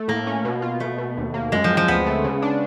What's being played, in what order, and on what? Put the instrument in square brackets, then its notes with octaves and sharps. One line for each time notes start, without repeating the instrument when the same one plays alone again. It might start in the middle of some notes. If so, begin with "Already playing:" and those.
Already playing: [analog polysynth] A3
[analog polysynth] A2 [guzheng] A#3
[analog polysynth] C#4
B2
F4
[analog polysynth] B2 [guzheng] A3
[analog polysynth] B2
D#2
A#3
[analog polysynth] F#2 [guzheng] G#3
[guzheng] F3
[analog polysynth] C4
[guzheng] F3
[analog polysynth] D2 [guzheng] B3
[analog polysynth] A3
C#3
D4